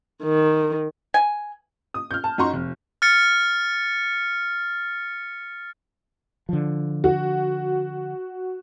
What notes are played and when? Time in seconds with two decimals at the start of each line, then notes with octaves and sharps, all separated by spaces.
0.23 D#3
1.14 G#5
1.94 D#6
2.11 F6 G6
2.24 A5
2.38 F#2 D#4 F#4 A#5 C6 C#6
2.53 F1
3.02 F6 A6 C#7
6.49 D3 F3
7.04 F#4